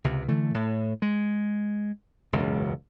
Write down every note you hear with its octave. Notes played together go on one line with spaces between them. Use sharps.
C#2 C3
D3 E3 A3
A2
G#3
E1 C#2 F#2